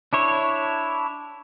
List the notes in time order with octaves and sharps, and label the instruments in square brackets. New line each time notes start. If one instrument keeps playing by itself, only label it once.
[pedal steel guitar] D4 E4 C#5